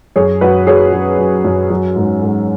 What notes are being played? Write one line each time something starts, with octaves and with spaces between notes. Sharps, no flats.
F#2 G#4 C#5
F#2 F#4 B4
F#3 G#4 C#5
F#3
F#3
F#2
F#3
G#2
G#2